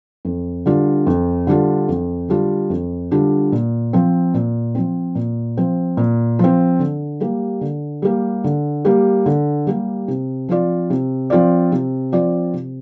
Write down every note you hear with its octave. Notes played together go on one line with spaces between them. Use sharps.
F2
D3 G3 D4 F4
F2
D3 G3 D4 F4
F2
D3 G3 D4 F4
F2
D3 G3 D4 F4
A#2
F3 C4
A#2
F3 C4
A#2
F3 C4
A#2
F3 C4
D3
G3 A#3 G4
D3
G3 A#3 G4
D3
G3 A#3 G4
D3
G3 A#3 G4
C3
F3 C4 F4 D5
C3
F3 C4 F4 D5
C3
F3 C4 F4 D5
C3